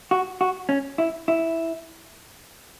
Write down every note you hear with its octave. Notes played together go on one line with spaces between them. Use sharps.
F#4
F#4
C#4
E4
E4